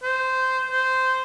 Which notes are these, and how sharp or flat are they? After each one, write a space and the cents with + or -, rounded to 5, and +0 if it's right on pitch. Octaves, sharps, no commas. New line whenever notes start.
C5 -10
C5 -10